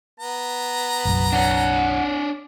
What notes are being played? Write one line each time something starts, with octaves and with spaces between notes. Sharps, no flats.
B3 A#5
F#1 B1 F#2
D4 C#5 F#5